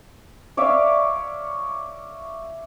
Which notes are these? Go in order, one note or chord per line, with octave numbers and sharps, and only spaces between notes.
C#5 D5 E5 F5